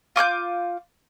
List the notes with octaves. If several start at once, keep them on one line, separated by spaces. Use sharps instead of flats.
F4 D6 F#6 G6